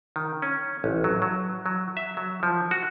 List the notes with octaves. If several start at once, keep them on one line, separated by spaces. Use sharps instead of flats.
D#3
C#4
A1
F#3
F#3
F#3
E5
F#3
F3
F#4